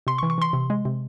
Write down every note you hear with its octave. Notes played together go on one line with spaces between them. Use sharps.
C3 C6
C#6
E3
C#6
E3 C6
C3
G#3
C3